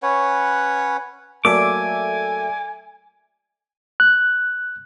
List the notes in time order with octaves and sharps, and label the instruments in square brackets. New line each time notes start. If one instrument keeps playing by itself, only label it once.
[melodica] C#4 B4 C#5 F#5
[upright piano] F#3 A3 A#3 [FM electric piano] A4 D5 E5 [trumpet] G#5 [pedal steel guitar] D6
[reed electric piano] F#6